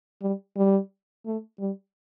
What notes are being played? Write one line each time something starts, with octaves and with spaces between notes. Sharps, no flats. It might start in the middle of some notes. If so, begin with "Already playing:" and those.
G3
G3
A3
G3